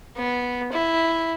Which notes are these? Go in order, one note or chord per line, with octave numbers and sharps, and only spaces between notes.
B3
E4